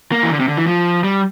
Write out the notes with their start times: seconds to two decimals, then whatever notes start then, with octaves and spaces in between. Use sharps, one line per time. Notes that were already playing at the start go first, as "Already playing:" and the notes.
0.12 A#3
0.23 E3
0.30 D3
0.40 C3
0.48 D3
0.57 E3
0.67 F3
1.04 G3